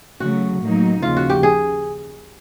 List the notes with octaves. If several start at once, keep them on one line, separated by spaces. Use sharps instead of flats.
C#3 F#3 A3 F#4
A2 F#3 A#3 D#4
D#2 C#3 F3 F4
F#4
G4
G#4